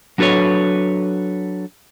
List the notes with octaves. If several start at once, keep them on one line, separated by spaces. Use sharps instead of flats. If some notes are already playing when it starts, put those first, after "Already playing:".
F#3 D4 F#4 A4 B4 C#5